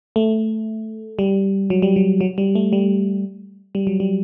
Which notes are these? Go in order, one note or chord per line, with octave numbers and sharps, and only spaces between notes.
A3
G3
F#3
G3
F#3
F#3
G3
A3
G3
G3
F#3
G3